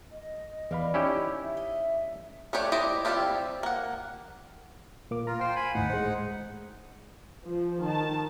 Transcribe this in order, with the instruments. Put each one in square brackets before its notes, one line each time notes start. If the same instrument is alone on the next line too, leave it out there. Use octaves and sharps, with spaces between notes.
[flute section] D#5
[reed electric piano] E2 F5 B5 [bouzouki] G3
[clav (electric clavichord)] C#4 E4 G4 [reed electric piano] D#4
[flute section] E5
[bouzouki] D#5
[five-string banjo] A3 D4 G4 C#5
E4 G4 C5 D5 D#5
G3 C4 E4 F4 G4
A#3 F#5
[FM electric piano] A#2 A#3 D6
[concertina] F4 [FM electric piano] A#5
[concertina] C5 G5 [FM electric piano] F5 C7
[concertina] G#5 B5
[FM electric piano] G#1 D2 A2 [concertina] D#4 F#5
[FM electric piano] G#3 C5
[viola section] F3
D#3 A5